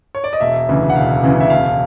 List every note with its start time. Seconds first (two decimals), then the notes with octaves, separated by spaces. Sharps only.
0.15 C#5
0.24 D5
0.33 D#5
0.41 E1 E5
0.69 D2 C#3 E3
0.90 F#5
0.96 E1 F5
1.23 D2 C#3 E3
1.40 E5
1.50 E1 F5